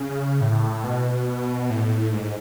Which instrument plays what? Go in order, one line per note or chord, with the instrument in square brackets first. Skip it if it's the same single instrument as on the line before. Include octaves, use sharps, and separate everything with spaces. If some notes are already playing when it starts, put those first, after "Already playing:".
Already playing: [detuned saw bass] C#3
A2
B2
A2
G#2